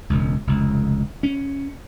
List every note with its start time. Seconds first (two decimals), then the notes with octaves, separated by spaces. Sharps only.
0.10 E1 C#2
0.47 F1 C#2
1.23 C#4